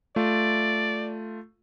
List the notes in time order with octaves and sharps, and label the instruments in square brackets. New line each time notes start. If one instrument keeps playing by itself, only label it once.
[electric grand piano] A3 F4 [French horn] D5